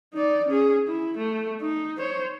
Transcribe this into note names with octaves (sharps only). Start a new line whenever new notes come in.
D#4 D5
C#4 G#4
E4
A3
D#4
C5 C#5